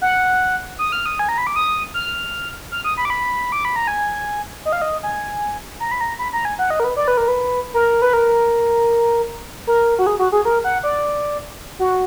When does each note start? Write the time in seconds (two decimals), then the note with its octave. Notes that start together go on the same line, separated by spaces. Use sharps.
0.01 F#5
0.79 D#6
0.92 F6
1.06 D#6
1.19 G#5
1.29 A#5
1.38 B5
1.47 D6
1.56 D#6
1.94 F6
2.72 F6
2.84 D#6
2.97 B5
3.05 D6
3.10 B5
3.52 D6
3.65 B5
3.76 A#5
3.88 G#5
4.65 D#5
4.73 F5
4.82 D#5
5.03 G#5
5.80 A#5
5.91 B5
6.01 A#5
6.19 B5
6.33 A#5
6.45 G#5
6.59 F#5
6.70 D#5
6.80 A#4
6.84 B4
6.96 D5
7.08 B4
7.17 A#4
7.28 B4
7.74 A#4
8.02 B4
8.13 A#4
9.67 A#4
9.99 F#4
10.07 G#4
10.19 F#4
10.32 G#4
10.45 A#4
10.64 F#5
10.83 D5
11.79 F#4